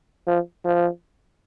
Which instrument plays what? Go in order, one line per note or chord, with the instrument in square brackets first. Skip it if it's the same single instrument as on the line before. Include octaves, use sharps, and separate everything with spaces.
[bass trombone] F3
F3